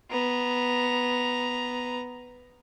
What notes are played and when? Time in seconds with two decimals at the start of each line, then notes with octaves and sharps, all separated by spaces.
0.11 B3 A#5